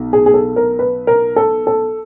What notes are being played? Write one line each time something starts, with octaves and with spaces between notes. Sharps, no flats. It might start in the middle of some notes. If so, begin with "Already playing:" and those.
Already playing: B1
G#4
G#4
A4
A#4
B4
A#4
A4
A4